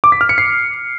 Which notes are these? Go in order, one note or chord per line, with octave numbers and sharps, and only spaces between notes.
D6
B6
F6
C#7
C7